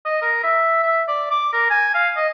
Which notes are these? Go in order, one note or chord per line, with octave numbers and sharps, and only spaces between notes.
D#5
A#4
E5
E5
D5
D6
A#4
G#5
F5
D#5